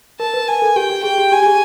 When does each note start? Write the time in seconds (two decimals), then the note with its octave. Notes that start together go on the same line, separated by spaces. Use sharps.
0.20 A#4 A5
0.34 B4
0.48 A#4 G#5
0.62 A4
0.76 G4 G5
0.90 G4
1.04 G#4 G5
1.18 G4
1.32 G4 G#5
1.42 G4
1.46 G#4